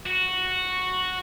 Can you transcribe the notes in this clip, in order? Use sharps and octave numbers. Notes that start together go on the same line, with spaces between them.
F#4